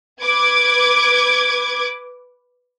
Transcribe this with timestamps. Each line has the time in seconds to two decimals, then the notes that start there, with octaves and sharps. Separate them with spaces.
0.22 B4 D6 G#6